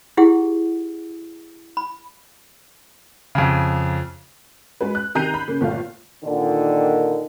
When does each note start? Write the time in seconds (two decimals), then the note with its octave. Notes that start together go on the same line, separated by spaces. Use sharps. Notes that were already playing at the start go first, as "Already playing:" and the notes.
0.17 E4 G4 G#4 F#5
1.77 B5
3.35 F2 C#3
4.81 G#3 F#4 B4
4.95 F#6
5.15 C3 D#3 A#5 G6 C7 D#7
5.34 B5
5.48 C#3 A#3
5.61 G1 A#2 A3 F5
6.25 A#2 D3 D#3